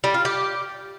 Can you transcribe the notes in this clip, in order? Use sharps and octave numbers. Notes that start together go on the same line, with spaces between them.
G3
F4
G4